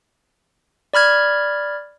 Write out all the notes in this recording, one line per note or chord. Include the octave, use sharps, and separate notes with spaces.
D5 B5 F6 G#6